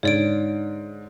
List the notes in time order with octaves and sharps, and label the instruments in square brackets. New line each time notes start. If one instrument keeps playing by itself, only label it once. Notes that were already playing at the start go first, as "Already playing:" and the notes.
[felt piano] G#2 D3 [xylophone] C#5 D5 D7